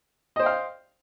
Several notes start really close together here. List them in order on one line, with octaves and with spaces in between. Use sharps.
D#5 C5 G5 F5